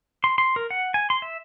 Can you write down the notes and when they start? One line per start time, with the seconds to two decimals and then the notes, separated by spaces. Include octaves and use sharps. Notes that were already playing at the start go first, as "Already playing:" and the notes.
0.24 C6
0.38 C6
0.56 A#4
0.70 F#5
0.94 G#5
1.10 C6
1.22 E5